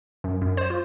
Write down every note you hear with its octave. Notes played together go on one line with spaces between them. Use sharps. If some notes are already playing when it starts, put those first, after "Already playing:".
F#2
F#2
C5
F4